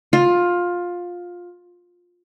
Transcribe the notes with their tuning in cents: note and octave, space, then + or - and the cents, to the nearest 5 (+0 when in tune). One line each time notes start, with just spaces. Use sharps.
F4 +15